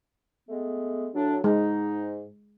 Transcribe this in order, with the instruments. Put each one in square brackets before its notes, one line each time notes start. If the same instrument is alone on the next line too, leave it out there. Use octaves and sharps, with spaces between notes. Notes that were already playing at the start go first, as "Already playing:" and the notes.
[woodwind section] G#3 A3 B3
A2 F#3 D4
[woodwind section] G#2 D#4 [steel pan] G#3